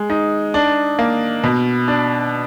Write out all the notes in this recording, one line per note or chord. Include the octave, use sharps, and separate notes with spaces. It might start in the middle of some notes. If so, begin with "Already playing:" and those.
Already playing: G#3
D#4
D4
A#3
B2
D4